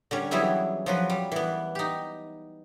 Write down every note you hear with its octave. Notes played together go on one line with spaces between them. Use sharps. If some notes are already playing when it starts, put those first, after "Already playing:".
D3 G3 C#4
E3 F#3 G3 B3 E4 G#4
F3 F#3 B4
G3
E3 B3
D#4 G4